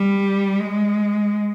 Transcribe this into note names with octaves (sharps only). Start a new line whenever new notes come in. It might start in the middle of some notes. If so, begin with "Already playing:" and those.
Already playing: G3
G#3